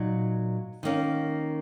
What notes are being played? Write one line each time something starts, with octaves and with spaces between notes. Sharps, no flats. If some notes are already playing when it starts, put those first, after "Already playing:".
Already playing: A#2 F#3 D#4
D#3 A#3 C#4